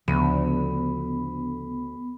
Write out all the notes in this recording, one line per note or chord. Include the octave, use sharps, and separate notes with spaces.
D2 C#3 F3 B3 B5